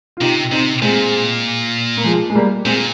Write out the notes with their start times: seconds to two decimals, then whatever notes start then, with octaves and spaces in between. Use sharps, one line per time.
0.17 F4
0.21 C3 D#4 G4
0.51 C3 C4 D#4
0.82 A#2 G#3 C4
1.97 A#3
2.04 F3 G#3
2.30 G#3
2.35 G3 A#3
2.65 A#2 G#3 C4